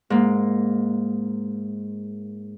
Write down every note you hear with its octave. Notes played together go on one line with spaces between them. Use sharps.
G#2 A#3